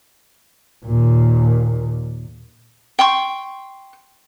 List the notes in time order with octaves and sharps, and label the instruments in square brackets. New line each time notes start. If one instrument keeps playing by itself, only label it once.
[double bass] D#2 A#2
[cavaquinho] G5 C6 C#6